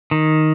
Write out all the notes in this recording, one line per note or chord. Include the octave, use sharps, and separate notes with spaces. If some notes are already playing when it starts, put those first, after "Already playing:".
D#3